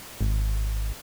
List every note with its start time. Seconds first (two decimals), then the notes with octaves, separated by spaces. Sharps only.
0.21 G#1